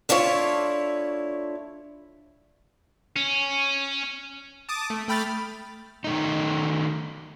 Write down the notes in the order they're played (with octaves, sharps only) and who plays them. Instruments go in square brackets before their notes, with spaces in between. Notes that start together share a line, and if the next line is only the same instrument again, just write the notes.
[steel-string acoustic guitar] A3 D4 E4 F4 C#5
[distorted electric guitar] C#4
[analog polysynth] A5 D6 D#6
A3
A3 G5 B5 F6 A6
[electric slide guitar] D#3 A3 D#4